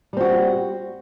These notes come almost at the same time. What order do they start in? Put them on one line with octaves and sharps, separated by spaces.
G3 C4 F#4